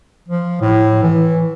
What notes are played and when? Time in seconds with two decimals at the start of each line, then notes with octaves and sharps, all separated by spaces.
0.28 F3
0.61 A2
1.03 E3